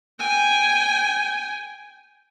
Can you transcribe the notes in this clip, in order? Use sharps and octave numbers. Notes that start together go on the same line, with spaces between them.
G5 G#5